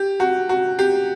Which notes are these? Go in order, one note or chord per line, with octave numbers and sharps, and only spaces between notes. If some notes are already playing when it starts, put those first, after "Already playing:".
Already playing: G4
F#4
F#4
G4